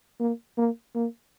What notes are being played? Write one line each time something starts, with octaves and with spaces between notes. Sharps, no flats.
A#3
A#3
A#3